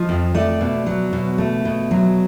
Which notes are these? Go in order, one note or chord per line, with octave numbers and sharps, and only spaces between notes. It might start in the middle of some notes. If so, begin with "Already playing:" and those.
Already playing: F3 D#5
F2
A3 D5
B2
F#3
B2
A3
B2
F#3